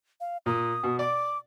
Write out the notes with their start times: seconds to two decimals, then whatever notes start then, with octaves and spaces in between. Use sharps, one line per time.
0.20 F5
0.46 A#2 D#6
0.83 B2
0.99 D5 D6